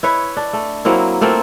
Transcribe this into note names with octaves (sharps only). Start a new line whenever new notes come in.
E4 B4 C#5
D4
A3
F#3 A#3 C4 E4
A3 A#3 C4 F4